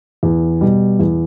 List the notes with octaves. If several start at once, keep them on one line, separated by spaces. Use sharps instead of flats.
E2
B2 G3
E2